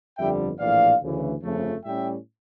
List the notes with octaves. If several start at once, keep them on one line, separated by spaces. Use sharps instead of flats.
G1 F2 D3 G3 E5 G5
A#1 A2 E3 D5 F5
D2 C#3 E3
G1 F2 C#3 F3 A3
A2 G3 C#4 E5 G5